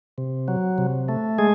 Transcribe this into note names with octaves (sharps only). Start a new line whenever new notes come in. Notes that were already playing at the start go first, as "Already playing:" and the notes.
C3
F#3
C3
A3
G#3 G#4